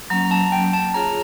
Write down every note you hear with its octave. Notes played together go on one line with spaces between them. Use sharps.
F#3 A#3 C#4 A#5
A#5
A5
G5
A5
F4 G#4 C#5 A#5